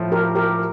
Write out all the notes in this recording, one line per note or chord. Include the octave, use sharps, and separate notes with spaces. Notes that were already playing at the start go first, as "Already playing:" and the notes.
Already playing: A2 F3 A3
G4 A#4
G4 A#4